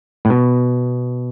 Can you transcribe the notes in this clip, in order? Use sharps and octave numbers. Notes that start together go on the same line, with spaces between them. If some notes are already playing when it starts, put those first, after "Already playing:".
A2
B2